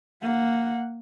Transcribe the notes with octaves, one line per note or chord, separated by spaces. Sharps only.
A#3 F#5